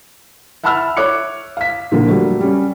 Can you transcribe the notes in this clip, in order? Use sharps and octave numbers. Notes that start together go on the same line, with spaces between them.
E5 F#5 A5 B5 E6 F6
C#5 E5 D6 F#6 C#7
F5 B6
A#2 D3 F3 A#3
F#3 G3 A3 A#3
G3 C#4